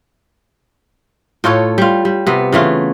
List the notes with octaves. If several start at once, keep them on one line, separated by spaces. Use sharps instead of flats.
A2 F4 A4 C#5
G3 F4
G3
C3 B3
C#3 E3 A3 F4